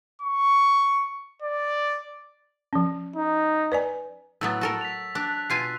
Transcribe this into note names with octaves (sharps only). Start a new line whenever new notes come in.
C#6
D5
F3 C#4
D#4
B4 D5 G#5
A2 F#3 B3 E6 A6
F#4 A4 A#4
B6 F7
D4 F#6
B2 F4 G#5 C7